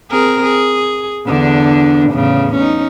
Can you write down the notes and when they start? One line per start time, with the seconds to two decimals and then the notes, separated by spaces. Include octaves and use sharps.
0.11 C4 G#4 A#4
0.43 G#4
1.26 E2 D3 D4
2.10 E2 A2 C#3
2.55 C#4 D#4